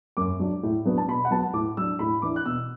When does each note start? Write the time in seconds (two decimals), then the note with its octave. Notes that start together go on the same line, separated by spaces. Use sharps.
0.17 F#2 D6
0.40 F#3 D4
0.63 A2
0.85 F#3 B3 D4
0.98 A5
1.08 B2 B5
1.25 F#5
1.31 F#3 B3 A5
1.53 A2 D6
1.77 F#3 D4 E6
1.99 A2 B5
2.22 E3 D4 D6
2.36 F#6
2.45 B2 E6